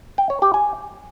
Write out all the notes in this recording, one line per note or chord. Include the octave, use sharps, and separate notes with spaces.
G5
C#5
G4
G#5